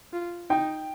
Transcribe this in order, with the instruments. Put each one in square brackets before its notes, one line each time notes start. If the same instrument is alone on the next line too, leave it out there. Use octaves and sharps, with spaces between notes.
[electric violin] F4
[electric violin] D#4 [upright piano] G5